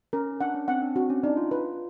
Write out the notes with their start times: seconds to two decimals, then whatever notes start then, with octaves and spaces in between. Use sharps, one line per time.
0.13 C#4 A#4
0.41 D4 F#5
0.54 C#4
0.68 C4 F#5
0.82 D4
0.95 C4 F#4
1.10 C#4
1.23 D4 D#4
1.37 F4
1.51 B4